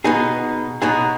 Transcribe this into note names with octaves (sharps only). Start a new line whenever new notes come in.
B2 B3 D#4 G#4
B2 B3 D#4 G#4